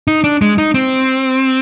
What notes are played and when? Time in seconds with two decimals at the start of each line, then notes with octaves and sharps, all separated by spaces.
0.07 D#4
0.24 D4
0.42 G#3
0.58 D#4
0.74 C4